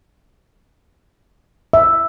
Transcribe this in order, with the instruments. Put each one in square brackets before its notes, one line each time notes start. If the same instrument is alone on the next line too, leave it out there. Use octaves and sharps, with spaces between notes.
[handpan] E5